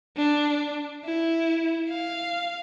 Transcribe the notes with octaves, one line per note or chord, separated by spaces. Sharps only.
D4
E4
F5